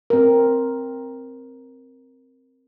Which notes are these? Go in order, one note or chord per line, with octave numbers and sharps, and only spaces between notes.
C4 A#4